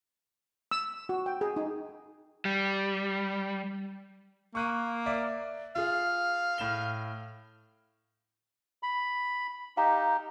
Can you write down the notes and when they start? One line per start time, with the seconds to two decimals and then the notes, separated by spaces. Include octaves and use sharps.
0.71 E6
1.09 F#4
1.26 G5
1.41 G#4
1.56 D#4
2.45 G3
4.55 A#3 C#6 F#6 D#7
5.06 D5 E5
5.76 F4 G#4 F5
6.58 A2 E7 G7
8.83 B5
9.77 D#4 G4 F5 A#5